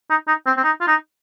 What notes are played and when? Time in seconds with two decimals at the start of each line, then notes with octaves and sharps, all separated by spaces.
0.10 D#4
0.28 D#4
0.46 C4
0.57 C4
0.64 D#4
0.81 F4
0.87 D#4